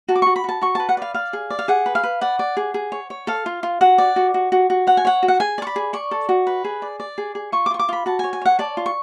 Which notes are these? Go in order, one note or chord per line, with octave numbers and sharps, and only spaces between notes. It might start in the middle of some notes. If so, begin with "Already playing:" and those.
F#4 A5
D6
F#4 C#6
B5
F#4 A5
F#4 C#6
B4 A5
F#5
D5 F5
D5 F5
G#4
D5
F5
G#4 F#5
B4
F5
B4
D5 F#5
D5
G#4
G#4
C#5
C#5
A4 F5
F4
F4
F#4 F#5
D5
F#4
F#4
F#4
F#4
C#5 F#5
G#5
C#5 F#5
F#4
F#5
G#4 G#5
D5 C#6
B5
G#4
D5 C#6
A4
F#4
B4
G#4
D5
D5
G#4
G#4
F4 C#6
D6
F4 C#6
D6
F4 B5
F#4 A5
C#5 G#5
G#5
C#5 F#5
D5 A5
F4
C#6